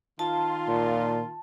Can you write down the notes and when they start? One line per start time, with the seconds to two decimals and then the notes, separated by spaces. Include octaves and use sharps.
0.19 D#3 F4 A5
0.68 A#2